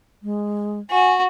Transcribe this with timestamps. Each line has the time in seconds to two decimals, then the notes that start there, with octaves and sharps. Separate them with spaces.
0.23 G#3
0.90 F#4 G#5